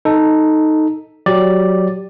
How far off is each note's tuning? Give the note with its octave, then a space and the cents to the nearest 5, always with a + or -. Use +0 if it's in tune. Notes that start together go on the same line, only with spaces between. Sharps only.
D#4 +0 A4 +0
F#3 +0 G4 +0 D5 +0